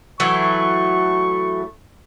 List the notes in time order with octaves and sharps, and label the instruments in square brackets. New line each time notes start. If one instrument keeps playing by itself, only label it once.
[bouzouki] E3 F#3 A3 [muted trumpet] C#6